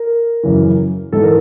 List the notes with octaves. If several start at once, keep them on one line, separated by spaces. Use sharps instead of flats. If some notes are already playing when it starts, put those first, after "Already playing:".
Already playing: A#4
F#2 C#3 E3
G#2 E3 A4
A#4